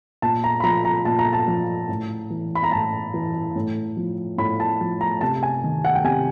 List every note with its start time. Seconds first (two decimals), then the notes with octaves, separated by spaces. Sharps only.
0.22 A#2 A5
0.44 A#5
0.60 B5
0.64 F3 A#5
0.85 A#5
1.05 A#2 A5
1.19 A#5
1.33 A5
1.48 F3
1.89 A2
2.30 E3
2.55 B5
2.64 A#5
2.72 A2 A5
3.14 E3
3.56 A2
3.97 F3
4.38 A2 B5
4.60 A5
4.81 F3
5.01 A#5
5.21 C3 A5
5.43 G#5
5.64 D#3
5.85 F#5
5.95 G5
6.04 C3 G#5